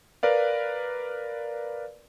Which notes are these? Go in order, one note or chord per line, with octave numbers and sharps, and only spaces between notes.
A#4 B4 D5 F5